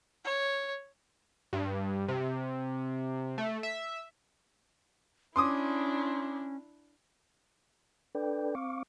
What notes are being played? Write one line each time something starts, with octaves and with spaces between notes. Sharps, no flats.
C#5
G2
C3
A3
E5
C#4 D4 E4 C6 D6 D#6
D4 A4 B4 D5 G5
C4 F5 C#6 D6